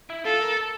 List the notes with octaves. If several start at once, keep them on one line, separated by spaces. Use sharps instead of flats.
E4
F4 A4
A#4
A4